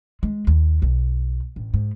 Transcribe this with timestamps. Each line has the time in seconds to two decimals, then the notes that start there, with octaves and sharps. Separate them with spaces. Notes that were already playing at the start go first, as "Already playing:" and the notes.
0.23 G#3
0.47 D#2
0.82 B1
1.56 A1
1.74 G#2